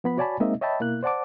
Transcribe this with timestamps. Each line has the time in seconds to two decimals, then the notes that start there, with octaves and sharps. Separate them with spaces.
0.04 F3 B3 B5
0.17 F#4 C#5 D5 G#5 A5 B5
0.40 G#3 A#3 C4 D#4 D#5 E5
0.61 C#5 D#5 E5 G5 A5 B5
0.80 B2 A#3 E4 F#6
1.03 C5 D5 F#5 A5 D6